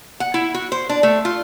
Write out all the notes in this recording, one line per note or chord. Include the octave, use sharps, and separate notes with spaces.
F#5
E4
F#4
C5
D4
A3
F4